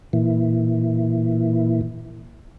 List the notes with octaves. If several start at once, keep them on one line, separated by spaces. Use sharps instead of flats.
A#2 E3